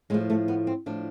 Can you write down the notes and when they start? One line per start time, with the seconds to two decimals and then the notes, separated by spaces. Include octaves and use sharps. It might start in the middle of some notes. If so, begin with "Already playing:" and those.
0.10 A2 F3 G#3
0.30 A3
0.48 B3
0.67 C4
0.86 A2 F3 D4